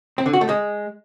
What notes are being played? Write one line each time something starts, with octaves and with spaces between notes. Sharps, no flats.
C4
D3
F#4
A3
G#3